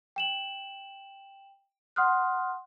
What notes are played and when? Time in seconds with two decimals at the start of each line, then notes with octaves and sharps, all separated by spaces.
0.16 G5 E7 F#7
1.96 F#5 C6 D#6 F6 F#6